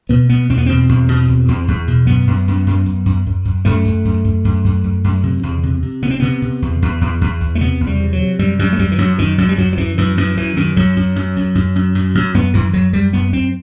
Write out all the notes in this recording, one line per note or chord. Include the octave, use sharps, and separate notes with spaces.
B2 B3
B2 B3
E2 C4
B3
B2 C4
E2
B2
E2
E2
E2
B2
F#2 B3
F#2
F#2
F#2
F#2
F#2
F#2
F#2
F#2 A3
F#2
F#2
F#2
F#2
F#2
F#2
F#2
C3
E2
C3
C3
C3 B3
C4
C3 B3
C3
E2
E2
E2
E2
E2
A3
C3 B3
E2
G3
C3
F#3
C3
F#2 G3
F#2 G3
A3
F#2 G3
E3
F#2 F#3
F#2 D#3
F#2 F#3
G3
F#2 F#3
F#3
F#2 E3
F#2 E3
F#2 E3
F#2 E3
F#2 D#3
F#2 F#3
F#2
F#2
F#2
F#2
F#2
F#2
F#2
F#2 B3
F#2 E3
F#2 F#3
F#2 G3
F#2 B3
F#2 C4